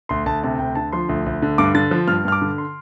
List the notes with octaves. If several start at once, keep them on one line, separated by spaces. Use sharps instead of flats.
D2 C6
D2 A5
C3 A5
D2 G5
D3 A5
F3 C6
D2
D2
D3
G2 D6
D3 A6
F3
G2 F6
G2 F6
D6
D3
C6